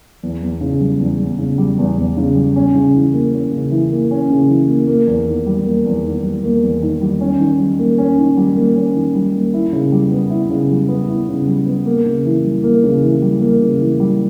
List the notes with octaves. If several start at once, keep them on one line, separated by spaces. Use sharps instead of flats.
E2
E2
C#3
G3
E2
E2
C#3
G3
E2
E2
C#3
G3
C#4
C#3
E3
A#3
C#4
C#3
E3
A#3
C#4
C#3
E3
A#3
A#3
E2
D#3
G3
A#3
E2
D#3
G3
A#3
E2
D#3
G3
C#4
D#3
G3
A#3
C#4
D#3
G3
A#3
C#4
D#3
G3
A#3
E4
C#3
G3
B3
E4
C#3
G3
B3
E4
C#3
G3
B3
A#3
C#3
E3
G3
A#3
C#3
E3
G3
A#3
C#3
E3
G3